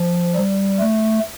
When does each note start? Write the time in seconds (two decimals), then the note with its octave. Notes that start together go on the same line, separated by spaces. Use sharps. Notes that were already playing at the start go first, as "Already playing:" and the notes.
Already playing: F3
0.35 G3
0.79 A3